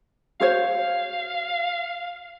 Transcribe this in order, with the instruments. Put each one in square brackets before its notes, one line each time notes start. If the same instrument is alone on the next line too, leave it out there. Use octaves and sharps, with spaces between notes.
[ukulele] F#4 C5 C#5 [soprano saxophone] F5